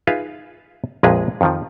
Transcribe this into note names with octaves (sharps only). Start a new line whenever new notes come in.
D#4 F4 G#4 B4 E5 F5
A#1 F2 A#2 G#3 G#4 B4
F2 D#3 F3